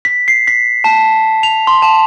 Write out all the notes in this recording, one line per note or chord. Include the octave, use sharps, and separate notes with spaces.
B6
C7
B6
A5
F7
C6
A5